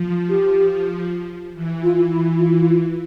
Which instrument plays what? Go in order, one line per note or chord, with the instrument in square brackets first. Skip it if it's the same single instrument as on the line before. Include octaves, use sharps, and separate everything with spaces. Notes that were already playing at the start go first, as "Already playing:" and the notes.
Already playing: [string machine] F3
[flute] G4
[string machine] E3
[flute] F4
E4
F4
F4